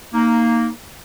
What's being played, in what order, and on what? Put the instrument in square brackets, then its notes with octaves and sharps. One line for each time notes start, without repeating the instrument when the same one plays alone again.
[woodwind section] A#3 D#4